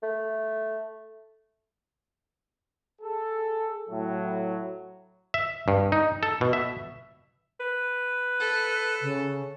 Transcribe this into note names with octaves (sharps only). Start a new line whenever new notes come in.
A3
G#4 A4
A2 F#3
E5
G2
D#4
A4
B2
E5
B4
A4
C#3